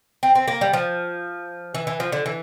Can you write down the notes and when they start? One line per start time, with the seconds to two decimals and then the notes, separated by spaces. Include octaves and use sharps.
0.23 C4
0.35 C4
0.48 A#3
0.61 G3
0.73 F3
1.75 E3
1.87 E3
2.00 F3
2.12 D3
2.26 E3